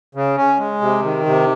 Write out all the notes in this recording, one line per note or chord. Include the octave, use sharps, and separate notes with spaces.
C#3
C#4
G#3
C3
D#3
C3